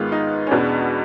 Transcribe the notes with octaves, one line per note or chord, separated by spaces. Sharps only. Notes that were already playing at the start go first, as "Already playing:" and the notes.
Already playing: G#2 D#3 G#3 B3 F4
D#4
C#4
E2 B2 G#3 B3 D4